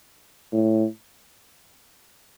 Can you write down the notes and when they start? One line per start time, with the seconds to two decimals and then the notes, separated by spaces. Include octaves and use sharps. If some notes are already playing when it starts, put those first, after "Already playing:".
0.53 A2